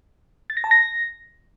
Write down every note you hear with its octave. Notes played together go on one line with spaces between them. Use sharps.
A6
A#6
A5
A#6